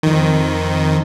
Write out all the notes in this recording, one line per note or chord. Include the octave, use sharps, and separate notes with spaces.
F2 D#3